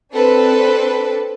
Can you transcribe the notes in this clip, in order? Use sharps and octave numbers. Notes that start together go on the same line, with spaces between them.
C4 D4 A4 B4